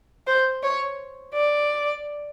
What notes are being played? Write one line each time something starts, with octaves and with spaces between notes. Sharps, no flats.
C5
C#5
D5